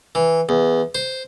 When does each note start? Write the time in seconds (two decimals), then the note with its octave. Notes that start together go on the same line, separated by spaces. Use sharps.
0.15 E3
0.49 E2
0.95 C5